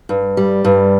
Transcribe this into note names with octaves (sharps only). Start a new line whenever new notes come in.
G2
G3
G2